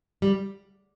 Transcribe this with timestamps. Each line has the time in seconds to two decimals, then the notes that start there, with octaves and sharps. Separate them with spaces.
0.22 G3